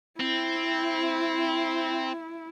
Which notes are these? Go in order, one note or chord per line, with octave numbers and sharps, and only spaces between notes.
C4 E4